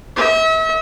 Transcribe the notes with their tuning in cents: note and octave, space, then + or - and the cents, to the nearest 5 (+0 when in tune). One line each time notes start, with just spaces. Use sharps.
E5 -40